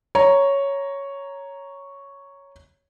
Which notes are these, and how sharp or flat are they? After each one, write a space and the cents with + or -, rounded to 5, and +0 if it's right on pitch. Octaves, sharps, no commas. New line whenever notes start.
C#5 +0 A#5 +0